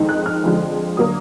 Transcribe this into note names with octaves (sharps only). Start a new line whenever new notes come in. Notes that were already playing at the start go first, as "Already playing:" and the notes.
Already playing: F2 D#3 G#3 D#4
F#6
F6
F2 D3 F3 G#3
D3 F#3 A#3 D#6